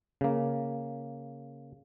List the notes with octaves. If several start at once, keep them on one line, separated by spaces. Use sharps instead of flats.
C#3 A#3